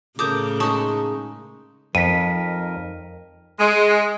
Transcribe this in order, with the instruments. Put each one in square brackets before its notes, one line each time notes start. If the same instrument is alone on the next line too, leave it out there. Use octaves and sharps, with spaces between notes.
[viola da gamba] A2 C#3 [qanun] A4 A#4 [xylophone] D6 D#6 G6
[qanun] G#3 D#4 [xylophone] A5 C#6 D#6
[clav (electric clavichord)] F2 [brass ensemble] F3 D#4 A#4 [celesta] B6 D#7
[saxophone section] G#3